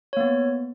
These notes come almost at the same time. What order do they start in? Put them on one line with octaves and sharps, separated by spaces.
C#5 A#3 B3